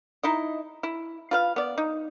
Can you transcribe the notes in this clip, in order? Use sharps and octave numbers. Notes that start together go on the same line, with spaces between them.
D#4 E4 D#5
E4
F4 B4 F5
B3 D5
D#4